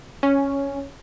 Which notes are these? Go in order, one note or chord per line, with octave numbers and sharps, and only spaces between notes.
C#4